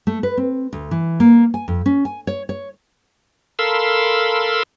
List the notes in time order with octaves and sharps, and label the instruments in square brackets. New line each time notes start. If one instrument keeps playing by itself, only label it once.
[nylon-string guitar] A3
B4
C4
D2
E3
A#3
G#5
F2
C#4
G#5
C#5
C#5
[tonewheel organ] A4 A#4 F5 B5 C6 E6